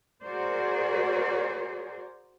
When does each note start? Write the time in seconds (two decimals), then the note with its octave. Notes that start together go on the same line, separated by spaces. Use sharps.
0.23 F#4 G#4 A#4 C5 D5